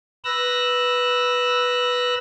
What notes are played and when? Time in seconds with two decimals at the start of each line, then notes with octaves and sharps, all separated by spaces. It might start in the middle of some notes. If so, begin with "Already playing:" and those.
0.25 B4 E6 F#6 A#6